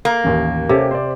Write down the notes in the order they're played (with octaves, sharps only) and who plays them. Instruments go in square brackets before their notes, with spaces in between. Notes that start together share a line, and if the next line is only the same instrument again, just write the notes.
[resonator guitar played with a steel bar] A#3
[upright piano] A1 D#2
[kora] C3 [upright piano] C#4 G4 A4
[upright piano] C5 D5